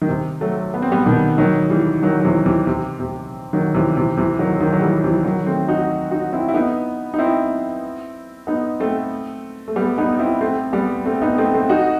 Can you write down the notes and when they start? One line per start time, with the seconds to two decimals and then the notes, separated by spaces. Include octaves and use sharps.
0.02 D#3
0.09 C3
0.41 F#3 A3
0.74 B3
0.82 C4
0.92 G3 B3
1.06 B2 D#3
1.38 D#3 F#3
1.70 E3 G3
2.03 D#3 F#3
2.20 F#3
2.24 C3 E3
2.46 C3 E3
2.67 C3
3.00 C3
3.53 D#3 F#3
3.74 C3 E3
3.96 C3 E3
4.17 C3 E3
4.39 D#3 F#3
4.60 D#3 F#3
4.73 F#3
4.82 E3 G3
5.04 C3 E3
5.25 D#3 F#3
5.46 A3 C4
5.68 D#4 F#4
6.11 D#4 F#4
6.33 C4 E4
6.49 E4
6.54 B3 D#4
7.14 D#4
7.19 C4 E4
8.47 B3 D#4
8.80 A3 C4
9.68 A3
9.76 G3 B3
9.98 B3 D#4
10.19 C4 E4
10.41 A3 C4
10.73 G3 B3
11.05 A3 C4
11.22 B3 D#4
11.38 A3 C4
11.54 A3 C4
11.69 D#4 F#4